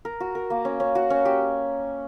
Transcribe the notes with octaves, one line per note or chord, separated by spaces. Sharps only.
A#4
F#4
A#4
A#3
C#4
C#4
F#4
C#4
G4